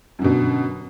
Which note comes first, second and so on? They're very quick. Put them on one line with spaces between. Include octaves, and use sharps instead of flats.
F#2 D3 B2